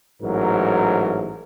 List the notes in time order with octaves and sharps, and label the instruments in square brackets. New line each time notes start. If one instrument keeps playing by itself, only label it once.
[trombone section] A1 G#2 F#3 A#4